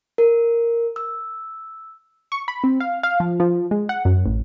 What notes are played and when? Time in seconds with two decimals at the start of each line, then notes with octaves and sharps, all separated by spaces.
0.18 A#4
0.96 E6
2.32 C#6
2.48 B5
2.64 C4
2.80 F5
3.03 F5
3.20 F3
3.40 F3
3.71 G#3
3.89 F#5
4.05 F#2
4.26 A1